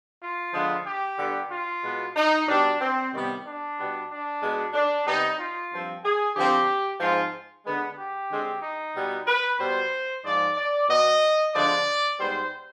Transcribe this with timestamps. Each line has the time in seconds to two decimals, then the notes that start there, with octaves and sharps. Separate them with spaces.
0.21 F4
0.53 D3 F3 G#3 B3
0.86 G4
1.18 G2 D3 G3 B3
1.51 F4
1.83 B2 G#3 B3
2.16 D#4
2.48 B2 G3 B3 D4
2.80 C4
3.12 C3 D#3 G3 B3
3.45 D4
3.78 B2 G3 B3
4.09 D4
4.41 B2 G#3 B3
4.74 D4
5.06 C3 G3 B3 D#4
5.39 F4
5.71 G2 F3 C4
6.04 G#4
6.35 D3 F3 C4 G4
7.00 G#2 F3 C4 F4
7.65 D3 G#3 B3
7.97 G4
8.30 D3 G#3 C4
8.63 D#4
8.95 B2 G3 B3
9.27 B4
9.59 B2 G3 B3 C5
10.24 G#2 F3 G#3 D5
10.57 D5
10.89 B2 B3 D#5
11.54 D3 F3 G#3 B3 D5
12.18 G#2 G3 B3 C5